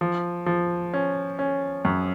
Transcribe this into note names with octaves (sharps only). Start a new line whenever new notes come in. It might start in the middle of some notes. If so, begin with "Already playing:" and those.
F3
F3
C#4
C#4
F#2